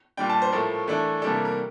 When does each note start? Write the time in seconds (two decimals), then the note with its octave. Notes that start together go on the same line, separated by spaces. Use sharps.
0.17 A#2 G3 D4 G5
0.30 A5
0.42 C5
0.52 A2 F3 A3 A#4
0.88 E3 A3 D4
1.22 C3 E3 G3 A#3 D4 A4
1.33 A#4
1.45 A#4